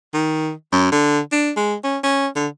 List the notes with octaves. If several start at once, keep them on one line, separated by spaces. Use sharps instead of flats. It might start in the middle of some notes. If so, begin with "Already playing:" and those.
D#3
F#2
D3
D4
G#3
C#4
C#4
D3